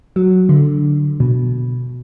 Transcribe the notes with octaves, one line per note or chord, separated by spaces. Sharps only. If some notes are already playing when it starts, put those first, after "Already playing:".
F#3
D3
B2